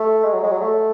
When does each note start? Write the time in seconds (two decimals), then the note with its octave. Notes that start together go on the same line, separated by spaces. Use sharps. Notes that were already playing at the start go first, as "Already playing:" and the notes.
Already playing: A3
0.24 G#3
0.34 F#3
0.43 G#3
0.52 F#3
0.61 A3